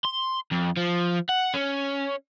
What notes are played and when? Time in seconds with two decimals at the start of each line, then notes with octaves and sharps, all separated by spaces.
0.05 C6
0.51 F2
0.77 F3
1.29 F#5
1.54 C#4